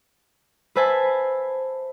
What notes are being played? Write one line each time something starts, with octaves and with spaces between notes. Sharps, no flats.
B4 C5 E5 G#5 A5 B5